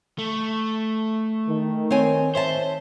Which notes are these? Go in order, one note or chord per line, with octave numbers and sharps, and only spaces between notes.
A3
D#3
C4 C#5 G#5
C5 C#5 E5 A5